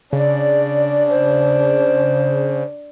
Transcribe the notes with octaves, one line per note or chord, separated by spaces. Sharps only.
C#3 D4 D5
C5